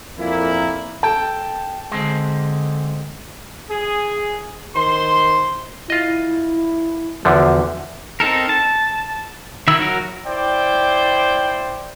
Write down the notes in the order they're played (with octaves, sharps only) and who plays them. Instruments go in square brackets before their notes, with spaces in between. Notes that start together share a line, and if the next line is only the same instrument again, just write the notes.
[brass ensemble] F2 A#2 A#3 E4
[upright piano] A4 A5 [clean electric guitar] G5
[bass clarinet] D3 [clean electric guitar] G#3 C4
[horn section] G#4
D#3 C5 C6
[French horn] E4 [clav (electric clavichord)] F4 D#5
[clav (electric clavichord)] E2 D3 F3 [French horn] F#4
[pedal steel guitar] C4 D#4 A4 A#4
A5
D#3 E4 E6
F#3 F#4 A#4
[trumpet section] E4 C5 D5 G5